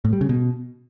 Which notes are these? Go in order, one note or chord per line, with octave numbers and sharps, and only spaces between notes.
A2
G3
C#3
B2